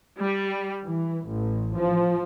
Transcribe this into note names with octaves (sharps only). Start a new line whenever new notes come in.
G3
E3
A1
F3